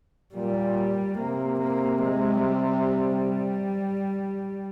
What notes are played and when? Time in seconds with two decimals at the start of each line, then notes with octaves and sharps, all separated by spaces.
0.34 A#2 G3
1.18 C3 A#3
1.60 A#3
2.03 G#3
2.44 G3